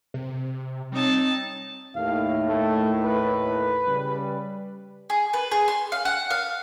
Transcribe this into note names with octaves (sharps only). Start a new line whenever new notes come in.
C3
G3 C4 D#4 C#5 A5
D#2 A2 F5
A3
B4
C#3 G3
G#4
B4
G#4
C6
F5
F#5
F5